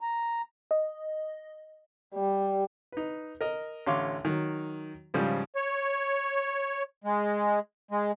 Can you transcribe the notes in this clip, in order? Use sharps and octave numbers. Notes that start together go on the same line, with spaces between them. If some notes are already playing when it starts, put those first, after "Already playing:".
A#5
D#5
G3
D#4 B4
A#4 D#5
A1 D3 C#5 F5 C6 D6
D#3 F#3
G#2 C#3 F3 G3
C#5
G#3
G#3